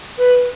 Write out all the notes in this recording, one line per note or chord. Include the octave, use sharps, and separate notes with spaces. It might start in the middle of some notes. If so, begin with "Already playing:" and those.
B4